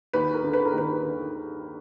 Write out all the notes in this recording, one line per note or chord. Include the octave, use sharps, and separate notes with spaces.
D#2 B4
A#4
D3
B4
A#4
D#2 B4
D3